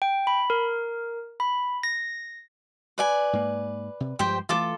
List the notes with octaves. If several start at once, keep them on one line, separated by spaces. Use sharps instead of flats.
G5
B5
A#4
B5
A#6
B4 D5 G#5
G#2 A#3
C3
G2 F3 G#3 G4 C5 G5
E3 F3 A3 F4 A4 D6